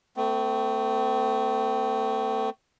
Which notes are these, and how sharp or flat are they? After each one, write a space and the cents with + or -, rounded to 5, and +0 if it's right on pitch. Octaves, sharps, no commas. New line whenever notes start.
A3 +20 C4 -30